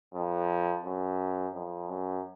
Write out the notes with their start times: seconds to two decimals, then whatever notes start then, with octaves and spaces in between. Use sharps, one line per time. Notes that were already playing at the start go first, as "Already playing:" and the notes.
0.14 F2
0.85 F#2
1.54 F2
1.89 F#2